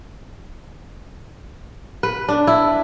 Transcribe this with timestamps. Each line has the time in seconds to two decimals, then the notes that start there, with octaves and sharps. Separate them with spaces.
2.03 B4
2.29 D4
2.47 E4